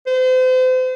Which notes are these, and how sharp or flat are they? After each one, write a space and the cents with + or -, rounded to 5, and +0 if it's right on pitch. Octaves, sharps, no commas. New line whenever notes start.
C5 -35